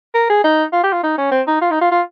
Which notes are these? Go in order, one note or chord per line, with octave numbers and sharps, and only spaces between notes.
A#4
G#4
D#4
F4
G4
F4
D#4
C#4
C4
D#4
F4
D#4
F4
F4